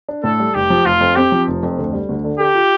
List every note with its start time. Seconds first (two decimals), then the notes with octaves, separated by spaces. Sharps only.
0.09 D4
0.24 A2 A4
0.40 G3
0.55 F1 G4
0.70 F3
0.85 F1 F4
1.01 F2
1.16 C4 G4
1.32 F3
1.48 F1
1.63 F2
1.78 D2
1.93 G3
2.09 D2
2.24 D3
2.39 G4 A4
2.55 F4